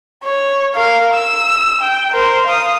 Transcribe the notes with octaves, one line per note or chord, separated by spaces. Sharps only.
C#5
A#4 F5
E6
G5
A#4 C5
F5 D#6